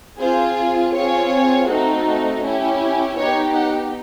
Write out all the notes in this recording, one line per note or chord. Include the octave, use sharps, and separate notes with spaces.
C4 F4 G#4 C5
C4 F4 G#4 C#5
A3 C4 D#4 F#4
C#4 E4 G4
B3 D#4 G4 C#5
F#5